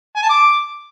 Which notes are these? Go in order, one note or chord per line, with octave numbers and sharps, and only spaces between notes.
G#5
A5
D6